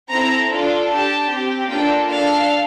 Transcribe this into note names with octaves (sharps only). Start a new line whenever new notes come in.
C4 E4 A4 A#5
D4 F4 A4
D4 G4 A5
C4 G4
A#3 D4 F4 A4 G5
D4 A4 F5